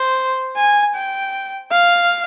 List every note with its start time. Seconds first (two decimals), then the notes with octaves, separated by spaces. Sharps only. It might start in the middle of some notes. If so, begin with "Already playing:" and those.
Already playing: C5
0.57 G#5
0.95 G5
1.72 F5